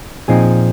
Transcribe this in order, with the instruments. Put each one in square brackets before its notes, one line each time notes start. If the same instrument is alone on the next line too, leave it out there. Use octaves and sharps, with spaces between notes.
[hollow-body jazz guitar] A#2 F3 C4 D#4 G#4